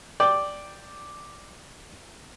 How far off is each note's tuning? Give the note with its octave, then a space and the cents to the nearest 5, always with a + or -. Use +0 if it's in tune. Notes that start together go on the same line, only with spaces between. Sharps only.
D5 +0 G5 +0